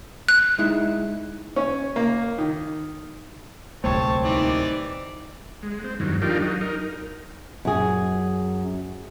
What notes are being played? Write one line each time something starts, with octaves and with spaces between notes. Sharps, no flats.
F#6
G#3 D#4 E4
C#4
A#3
D#3
D1 C2 A3 C4 C#5 A5
A#2 E3 G3 D#4 D5
G#3
C4
E2 G2 D#3 F#3
D4 D#4 F4 G4 A#4
F#3 D#4
D#4 A#4
F#2 G#4